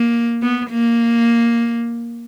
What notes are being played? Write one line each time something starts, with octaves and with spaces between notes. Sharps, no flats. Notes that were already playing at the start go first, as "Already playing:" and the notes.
Already playing: A#3
B3
A#3